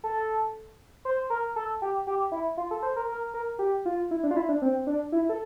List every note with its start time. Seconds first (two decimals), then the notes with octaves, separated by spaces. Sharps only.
0.04 A4
1.05 C5
1.30 A#4
1.56 A4
1.82 G4
2.07 G4
2.32 E4
2.57 F4
2.71 A4
2.83 C5
2.96 A#4
3.09 A#4
3.34 A#4
3.59 G4
3.85 F4
4.11 E4
4.23 D4
4.31 F4
4.36 E4
4.49 D4
4.62 C4
4.87 D4
5.12 E4
5.29 A4